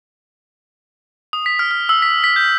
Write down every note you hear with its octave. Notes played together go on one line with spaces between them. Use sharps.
D#6
B6
F6
F6
E6
B6
B6
G6